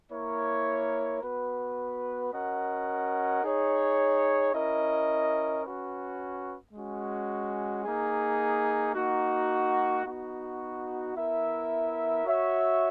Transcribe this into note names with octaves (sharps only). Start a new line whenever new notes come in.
A#3 E4 A#4 C#5
B3 F#4 B4
C#4 F#4 A#4 D#5 F#5
D#4 G#4 C#5
C#4 E4 A#4 D#5
C#4 F#4 B4
G#3 C#4 F#4
A#3 D#4 G#4
A#3 D#4 F#4
B3 D#4 F#4
B3 E4 A#4 E5
F#4 C#5 E5